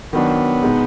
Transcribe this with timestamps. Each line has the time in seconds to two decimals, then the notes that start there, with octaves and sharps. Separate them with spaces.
0.13 D#3 F#3 B3 D4
0.63 B2 G#3 D#4